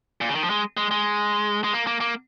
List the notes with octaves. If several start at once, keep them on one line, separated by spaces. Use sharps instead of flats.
A#2
C#3
D#3
F3
G#3
G#3
G#3
G#3
A#3
A#3
A#3